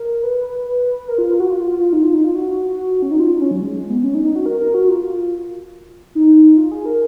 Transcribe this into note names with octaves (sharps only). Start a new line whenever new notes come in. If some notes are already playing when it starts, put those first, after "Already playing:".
Already playing: A#4
B4
A#4
F4
F4
F#4
F4
F4
D#4
F4
D#4
F4
F#4
C#4
D#4
F4
C#4
F#3
G#3
G#3
B3
C#4
D#4
D#4
F#4
A#4
A#4
F#4
F4
D#4
F4
G#4
A#4